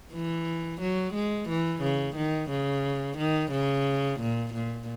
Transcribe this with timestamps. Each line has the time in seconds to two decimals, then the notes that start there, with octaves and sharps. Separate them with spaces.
0.13 E3
0.81 F#3
1.14 G#3
1.49 E3
1.82 C#3
2.16 D#3
2.50 C#3
3.18 D#3
3.52 C#3
4.20 A#2
4.54 A#2